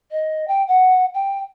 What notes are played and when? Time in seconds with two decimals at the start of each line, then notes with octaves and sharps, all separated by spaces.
0.11 D#5
0.47 G5
0.67 F#5
1.14 G5